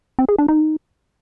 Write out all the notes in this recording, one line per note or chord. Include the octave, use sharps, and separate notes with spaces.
C4
G#4
D4
D#4